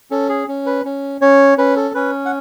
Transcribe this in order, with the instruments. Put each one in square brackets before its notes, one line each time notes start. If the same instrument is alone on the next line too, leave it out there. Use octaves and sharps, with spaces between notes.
[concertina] C#4 A4
G#4
C#4
B4
C#4
C#4 C#5
C#4 B4
A4
C#4 B4
F#5